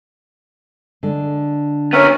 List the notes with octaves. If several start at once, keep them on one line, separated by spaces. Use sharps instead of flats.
D3 G#3
B3 C#4 A#4 C#5 E5